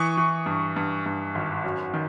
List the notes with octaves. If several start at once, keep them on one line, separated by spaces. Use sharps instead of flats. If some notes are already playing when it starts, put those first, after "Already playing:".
Already playing: E3 C#6 D#6
E3
G2
G2
G2
G#1
F#2
D#3